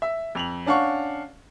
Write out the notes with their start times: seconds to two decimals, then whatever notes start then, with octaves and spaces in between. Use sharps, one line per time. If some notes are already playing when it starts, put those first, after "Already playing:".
0.02 E5
0.35 F2 F7 F#7
0.66 C#4 D4 F5 F#5 C#6